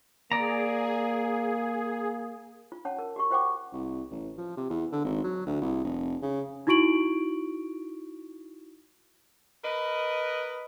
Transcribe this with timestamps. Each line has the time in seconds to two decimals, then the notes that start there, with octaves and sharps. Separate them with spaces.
0.32 A#3 G#4 D5 A#5
2.72 F4
2.85 C#4 C#5 F#5 A5
2.99 A#4
3.16 F#4 G4 C#6
3.31 F4 C5 F#5 G5 C#6 D6
3.73 C2
4.11 A1
4.37 F3
4.57 C3
4.70 E2
4.92 D3
5.04 G#1
5.24 F#3
5.46 D2
5.62 C2
5.84 F1
6.22 C#3
6.67 D#4 E4 F#4 C#6 D7 F#7
9.63 A#4 B4 D#5